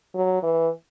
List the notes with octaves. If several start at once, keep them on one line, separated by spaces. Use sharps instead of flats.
F#3
E3